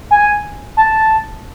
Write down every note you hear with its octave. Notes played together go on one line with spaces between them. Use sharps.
G#5
A5